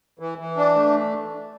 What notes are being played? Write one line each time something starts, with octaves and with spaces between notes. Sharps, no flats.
E3
E3
D4
A3